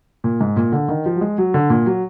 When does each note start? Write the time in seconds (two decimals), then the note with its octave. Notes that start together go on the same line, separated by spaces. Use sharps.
0.24 A#2
0.41 G#2
0.56 A#2
0.72 D3
0.89 D#3
1.06 F3
1.16 F#3
1.21 G#3
1.38 F#3
1.54 D3
1.70 A#2
1.86 F#3